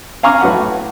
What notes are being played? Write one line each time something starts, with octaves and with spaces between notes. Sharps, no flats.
F5 G#5 A#5 C#6 D6 F6
A2 F#3 F#4 B4 F#5